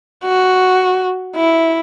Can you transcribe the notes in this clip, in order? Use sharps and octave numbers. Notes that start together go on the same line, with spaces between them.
F#4
E4